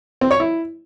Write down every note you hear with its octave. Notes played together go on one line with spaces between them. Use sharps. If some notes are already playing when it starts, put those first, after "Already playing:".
C4
C#5
E4